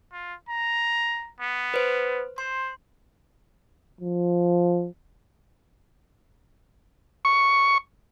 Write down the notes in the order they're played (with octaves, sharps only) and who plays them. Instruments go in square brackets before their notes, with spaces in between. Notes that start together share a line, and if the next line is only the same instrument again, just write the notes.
[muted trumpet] F4
A#5
B3
[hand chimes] B4 C5
[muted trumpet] C5 [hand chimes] C6
[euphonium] F3
[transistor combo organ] C#6